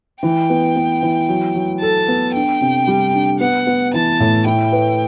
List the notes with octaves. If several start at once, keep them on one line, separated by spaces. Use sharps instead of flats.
E3 G5
B3
B3
E3
F#3
F#3
A4 A5
B3
D4 G5
C3
G3
D4
B3 F#5
B3
E3 A5
A2
E4 G5
B4